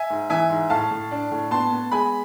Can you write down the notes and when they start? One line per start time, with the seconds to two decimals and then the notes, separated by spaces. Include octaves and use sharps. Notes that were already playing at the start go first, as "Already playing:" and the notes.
Already playing: E5 G#5
0.10 G#2
0.30 E3 E5 G#5
0.50 G#2
0.70 A2 F5 A5
0.91 A2
1.11 D4
1.32 A2
1.51 B3 A5 C6
1.72 B3
1.92 G#3 G#5 B5